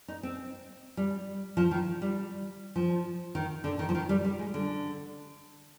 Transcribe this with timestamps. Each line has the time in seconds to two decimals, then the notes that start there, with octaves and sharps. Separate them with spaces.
0.08 D#4
0.23 C4
0.97 G3
1.57 F3
1.71 D#3
2.02 G3
2.76 F3
3.35 D#3
3.64 D3
3.79 D#3
3.89 F3
3.95 D#3
4.09 G3
4.24 G3
4.39 G#3
4.54 D3